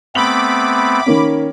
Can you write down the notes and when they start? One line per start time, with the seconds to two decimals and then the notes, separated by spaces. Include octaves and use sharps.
0.15 A3 B3 C4 B5 D6 F#7
1.06 D#3 A#3 C#4